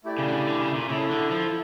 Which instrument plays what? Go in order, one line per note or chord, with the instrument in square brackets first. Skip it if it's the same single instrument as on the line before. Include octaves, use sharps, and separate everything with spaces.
[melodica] A3 E4 G4 D5
[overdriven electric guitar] C#3
D3
C#3
D3
C#3
A#2
[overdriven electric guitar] C#3 [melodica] E4 A4 E5
[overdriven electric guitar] D3
F3